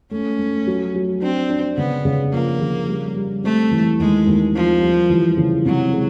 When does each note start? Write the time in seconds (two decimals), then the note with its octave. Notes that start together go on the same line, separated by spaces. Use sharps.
0.11 A3 C#4
0.39 A3
0.67 F#3
0.95 F#3
1.22 C4 D4
1.49 D4
1.77 C#3 B3
2.05 C#3
2.33 F3 A#3
2.61 C#3
2.88 G3
3.16 G3
3.44 A3 C4
3.71 E3
3.99 D#2 G#3
4.27 D#2
4.54 F3 C4
4.81 G3
5.10 E3
5.37 C#3
5.65 C3 F#3
5.93 G#3